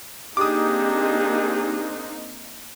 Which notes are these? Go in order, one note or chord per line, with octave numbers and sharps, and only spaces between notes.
A#3 C4 D4 D#4 G4 G#4 D6 D#6